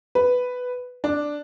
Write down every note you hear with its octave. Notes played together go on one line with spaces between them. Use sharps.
B4
D4